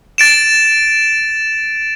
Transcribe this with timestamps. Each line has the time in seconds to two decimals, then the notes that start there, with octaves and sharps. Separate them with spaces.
0.18 A6 D7 E7